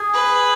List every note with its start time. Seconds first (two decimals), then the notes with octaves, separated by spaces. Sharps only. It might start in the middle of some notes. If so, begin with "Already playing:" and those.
Already playing: G#4
0.14 B4